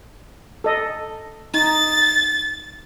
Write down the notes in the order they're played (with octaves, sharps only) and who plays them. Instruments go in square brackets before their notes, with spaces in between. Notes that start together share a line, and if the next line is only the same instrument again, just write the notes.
[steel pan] A4 D#5
[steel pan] D#4 [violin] A6